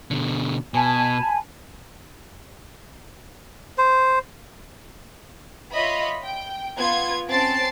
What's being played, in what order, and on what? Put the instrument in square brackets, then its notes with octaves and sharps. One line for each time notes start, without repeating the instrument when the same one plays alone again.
[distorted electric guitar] B2 D3
[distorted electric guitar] B2 [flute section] G#5 A5 B5
[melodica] C5
[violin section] F4 C#5 D#5 E5 B5
G5
B3 F4 G#6
C4 C#4 A5 A6 C7 D7